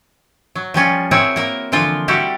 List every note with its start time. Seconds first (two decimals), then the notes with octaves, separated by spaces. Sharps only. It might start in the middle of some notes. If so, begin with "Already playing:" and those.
0.55 F#3
0.74 F3 G3 C#4 F4
1.11 C4 E4 F#4 G#4 A#4 C#5
1.36 A#3 A#4
1.72 D3 E3 F3 F4
2.08 G3 E4 F#4 G4 A4